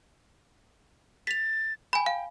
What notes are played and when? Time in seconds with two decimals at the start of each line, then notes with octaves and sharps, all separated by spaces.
1.27 A6 B6 F7
1.93 G5 G#5 B5
2.06 F5